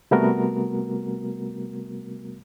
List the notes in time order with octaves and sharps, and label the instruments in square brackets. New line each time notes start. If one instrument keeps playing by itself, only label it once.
[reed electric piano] C3 G3 A3 B3 F#4 A#4